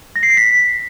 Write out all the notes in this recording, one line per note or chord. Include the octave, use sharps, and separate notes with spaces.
A#6
C7
A#6
B6